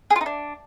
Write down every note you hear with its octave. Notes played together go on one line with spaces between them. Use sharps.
G#4
F4
D#4
D4